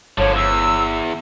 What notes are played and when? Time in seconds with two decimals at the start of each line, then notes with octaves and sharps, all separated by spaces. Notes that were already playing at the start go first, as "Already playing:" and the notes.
0.18 G1 D3 F3 C#5
0.35 E2 E6